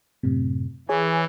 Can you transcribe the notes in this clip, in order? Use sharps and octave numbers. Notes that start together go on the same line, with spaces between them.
F#2 A2 C3
E3 G#4 C#5 G#5